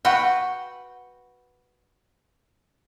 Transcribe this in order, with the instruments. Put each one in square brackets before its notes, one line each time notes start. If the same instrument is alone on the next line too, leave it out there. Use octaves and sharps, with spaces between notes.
[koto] F#4 B4 F#5 G5